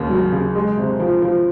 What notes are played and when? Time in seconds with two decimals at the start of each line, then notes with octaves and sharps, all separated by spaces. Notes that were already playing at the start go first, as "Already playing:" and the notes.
Already playing: D#2 C#3
0.10 F#3
0.32 C#3
0.55 G#3
0.78 C3
1.00 F3
1.22 F3